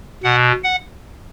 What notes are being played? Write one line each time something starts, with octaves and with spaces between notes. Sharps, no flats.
B2 F#5
F#5